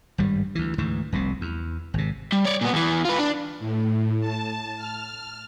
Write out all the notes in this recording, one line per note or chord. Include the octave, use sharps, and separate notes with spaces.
G#1 G2 G3
D2 E3
D2 G#2 E3
F1 C2 C3
E2
G#1 C3
G3
C#5 D5
A#2 B3
E2 E3
F4 B4
D4
A2
A5
F6